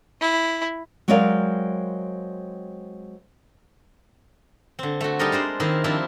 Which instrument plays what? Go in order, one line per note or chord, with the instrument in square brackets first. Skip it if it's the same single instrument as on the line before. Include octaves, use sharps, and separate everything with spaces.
[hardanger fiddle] E4
[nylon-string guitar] F#3 G#3 C4 A#4 D5 F5
[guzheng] D3 C4
A3 F#4
G3 D#4 G4 A4 A#4 D#5
G#3 D4 C5 D5
D#3 A#3 C4 E4 F4 G#4
F3 G3 C4 D4 E4 F4